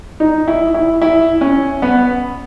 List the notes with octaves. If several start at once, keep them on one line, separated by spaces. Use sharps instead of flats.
D#4
E4
E4
E4
C#4
B3